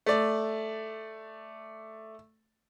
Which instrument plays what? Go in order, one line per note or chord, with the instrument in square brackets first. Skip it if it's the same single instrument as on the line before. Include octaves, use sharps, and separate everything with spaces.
[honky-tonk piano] A3 D5